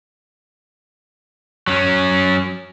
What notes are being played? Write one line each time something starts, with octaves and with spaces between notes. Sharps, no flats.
F#3 C#4